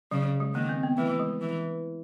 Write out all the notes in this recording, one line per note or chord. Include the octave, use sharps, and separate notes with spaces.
C#3 F#3
G#3
D#3 A#3
C4
B3
E3 A3
G#3
E3